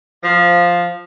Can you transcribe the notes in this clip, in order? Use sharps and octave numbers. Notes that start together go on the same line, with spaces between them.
F3